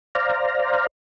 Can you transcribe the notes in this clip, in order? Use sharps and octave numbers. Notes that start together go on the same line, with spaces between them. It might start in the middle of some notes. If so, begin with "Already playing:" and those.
C5 D5 F5 A#5